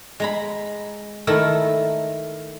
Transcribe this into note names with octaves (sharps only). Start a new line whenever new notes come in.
G#3 A#5 B5
D#3 A3 E4 A#4